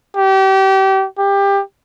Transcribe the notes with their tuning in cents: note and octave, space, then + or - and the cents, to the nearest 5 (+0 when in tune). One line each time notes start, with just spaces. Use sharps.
G4 -30
G4 +20